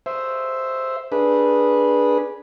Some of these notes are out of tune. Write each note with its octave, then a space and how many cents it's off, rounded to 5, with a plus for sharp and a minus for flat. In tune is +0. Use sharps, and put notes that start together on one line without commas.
C5 +0 E5 +0
D4 +0 G#4 +0 B4 -15